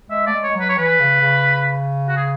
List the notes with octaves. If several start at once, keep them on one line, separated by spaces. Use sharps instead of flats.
G#3 E5
A3 D5
G#3
G#3 C#5
F#3
B4
C#5
E3 B4
C#3
C#3
F#4
G#4